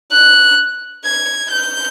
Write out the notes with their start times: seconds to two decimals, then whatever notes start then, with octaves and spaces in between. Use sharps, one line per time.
0.12 F#6
1.05 G#6
1.52 G6